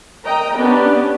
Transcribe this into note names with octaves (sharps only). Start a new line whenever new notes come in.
A#4 D#5 G5 A#5
B3 C#4 D4 G4